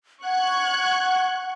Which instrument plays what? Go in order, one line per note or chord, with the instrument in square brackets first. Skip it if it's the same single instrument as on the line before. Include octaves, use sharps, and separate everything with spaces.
[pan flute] F#5 [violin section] C#6 F#6 G#6